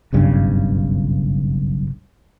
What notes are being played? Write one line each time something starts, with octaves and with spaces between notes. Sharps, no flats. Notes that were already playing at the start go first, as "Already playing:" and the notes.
F#1 B1 G2 C#3